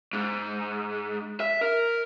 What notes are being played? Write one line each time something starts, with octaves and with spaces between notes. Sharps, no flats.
G#2
E5
A#4